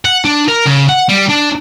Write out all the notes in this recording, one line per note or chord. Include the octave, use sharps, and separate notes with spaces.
F#5
D4
A#4
C#3
F#5
G3
D4